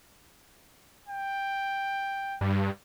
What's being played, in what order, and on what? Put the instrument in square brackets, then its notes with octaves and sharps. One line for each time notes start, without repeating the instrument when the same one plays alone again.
[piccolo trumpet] G5
[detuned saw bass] G2